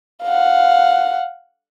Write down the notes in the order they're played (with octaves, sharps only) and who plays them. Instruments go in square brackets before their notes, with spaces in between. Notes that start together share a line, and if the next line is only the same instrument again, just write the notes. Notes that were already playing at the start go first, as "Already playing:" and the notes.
[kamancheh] F5 F#5